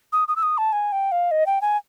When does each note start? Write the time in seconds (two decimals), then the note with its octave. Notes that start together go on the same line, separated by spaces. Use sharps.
0.13 D#6
0.28 D#6
0.36 E6
0.43 D#6
0.58 A5
0.73 G#5
0.92 G5
1.12 F5
1.31 D#5
1.46 G5
1.62 G#5